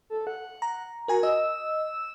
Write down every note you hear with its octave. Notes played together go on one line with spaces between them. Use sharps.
A4
F#5
A#5
F#4 A#4 G#5 A#5
D#5 E6